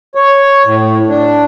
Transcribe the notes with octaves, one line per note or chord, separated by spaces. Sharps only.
C#5
A2
D4